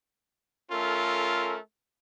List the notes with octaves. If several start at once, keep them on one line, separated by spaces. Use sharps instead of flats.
A3 C#4 F4 A4 A#4